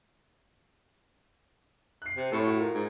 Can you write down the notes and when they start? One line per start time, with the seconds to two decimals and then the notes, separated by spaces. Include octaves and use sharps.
2.02 F#6 C7
2.16 C3
2.32 A2 A4 C#5 C#6
2.46 F#4
2.59 F4 A#4
2.74 G#2